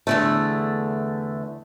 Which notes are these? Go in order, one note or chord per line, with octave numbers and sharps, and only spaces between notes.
E2 D3 A3